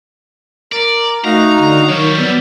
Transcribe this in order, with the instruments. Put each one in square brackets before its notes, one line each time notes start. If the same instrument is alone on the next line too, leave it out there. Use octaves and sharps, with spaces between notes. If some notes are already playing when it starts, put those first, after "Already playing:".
[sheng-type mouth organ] A#4 [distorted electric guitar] D5
[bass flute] A3 [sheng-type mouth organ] D#4 F#4 F5 [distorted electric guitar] A#5
[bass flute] D3 [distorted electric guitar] A#5
[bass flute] D#3 [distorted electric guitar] F#3 G3 [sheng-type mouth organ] C#5
[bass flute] B3 [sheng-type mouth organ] D5 E6